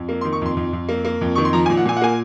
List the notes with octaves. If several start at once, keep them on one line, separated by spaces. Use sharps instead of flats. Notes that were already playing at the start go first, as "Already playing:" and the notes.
Already playing: F2
A#3
C6
D#3
C#6
F2 C6
F2
F2
A#3
A#3
F2
D#3 C#6
C6
F3 A#5
G#5
A#2
F#5
A#2 G#5
F#5
A#3 G#5